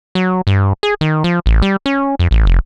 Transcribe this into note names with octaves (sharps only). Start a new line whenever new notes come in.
F#3
G2
G#4
D#3
F3
A1
G3
C#4
F2
A1
F1